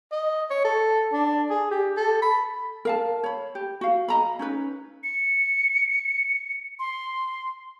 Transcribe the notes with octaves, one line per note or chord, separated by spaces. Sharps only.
D#5
C#5
A4
D4
G#4
G4
A4
B5
A#4 F5 A5
C#5 B5
G4
F#4 F5
D#5 A#5 B5
C#4 D#4 B4
C#7
C6